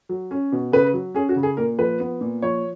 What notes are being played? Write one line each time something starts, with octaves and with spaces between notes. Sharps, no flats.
F#3
C#4
B2
C#3 B4
F#3
C#4 G#4
F#4
C#3
G#4
A#2 A#4
F3 B4
B3
A#2
F3 C#5